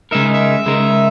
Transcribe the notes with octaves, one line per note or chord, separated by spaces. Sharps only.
C#3 G#3 D#4 A#4 E5
E5
C#3 G#3 D#4 A#4